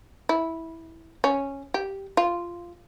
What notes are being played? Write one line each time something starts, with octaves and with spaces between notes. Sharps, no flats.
E4
C#4
G4
F4